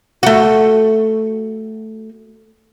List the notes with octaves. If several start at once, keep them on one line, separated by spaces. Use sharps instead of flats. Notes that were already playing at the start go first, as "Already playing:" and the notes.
A3 F#4